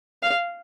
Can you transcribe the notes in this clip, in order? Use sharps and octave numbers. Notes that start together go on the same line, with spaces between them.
F5